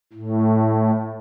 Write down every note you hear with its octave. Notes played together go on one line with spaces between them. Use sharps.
A2